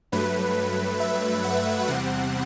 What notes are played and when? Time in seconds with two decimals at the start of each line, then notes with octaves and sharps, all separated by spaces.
0.12 G2 F#3 A3 B4
1.00 E5
1.44 F#5
1.88 E2 C3 G3 C4 F#5